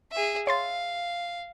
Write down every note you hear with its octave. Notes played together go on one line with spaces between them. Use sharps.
G#4 E5
C#5 F5 C6 A6